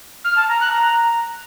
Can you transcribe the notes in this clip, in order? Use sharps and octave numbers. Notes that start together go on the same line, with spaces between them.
F6
A5
A#5
F#6
A#5